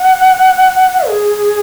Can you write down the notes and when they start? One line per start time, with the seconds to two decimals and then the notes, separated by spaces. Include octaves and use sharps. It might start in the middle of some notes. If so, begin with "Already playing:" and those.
Already playing: F#5
1.08 G#4